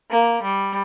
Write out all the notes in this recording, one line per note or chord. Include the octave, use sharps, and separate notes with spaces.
A#3
G3